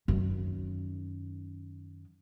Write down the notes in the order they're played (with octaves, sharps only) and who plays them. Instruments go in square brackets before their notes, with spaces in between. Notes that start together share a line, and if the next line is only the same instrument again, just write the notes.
[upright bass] F#2 D#3